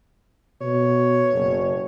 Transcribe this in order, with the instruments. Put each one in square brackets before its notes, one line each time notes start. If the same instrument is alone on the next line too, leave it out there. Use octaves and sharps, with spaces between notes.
[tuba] B2 [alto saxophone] C#5
[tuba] F#1